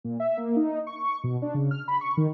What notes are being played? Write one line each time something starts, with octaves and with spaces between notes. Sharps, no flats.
A#2
E5
A#3
D#4
C#6
B2
D4
C#3
F6
B5
C#6
D#3